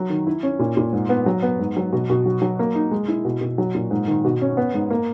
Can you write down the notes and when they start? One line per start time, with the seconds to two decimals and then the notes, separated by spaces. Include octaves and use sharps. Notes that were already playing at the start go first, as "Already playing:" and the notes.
Already playing: F#3
0.10 D#3
0.27 E4
0.43 C#4
0.59 A#2
0.77 A#2
0.93 G#2
1.09 B3
1.26 F#3
1.42 B3
1.59 G#2
1.77 F#3
1.93 B2
2.10 B2
2.26 F#3
2.42 F#3
2.59 A#3
2.75 D#4
2.91 G#3
3.08 E4
3.25 B2
3.41 B2
3.58 F#3
3.75 A#2
3.91 G#2
4.07 D#3
4.24 B2
4.42 C#4
4.57 B3
4.74 G#2
4.90 A#3